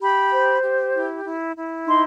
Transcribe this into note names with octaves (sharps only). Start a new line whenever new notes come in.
G4 B5
C5
G4
E4
E4
E4
D#4 C6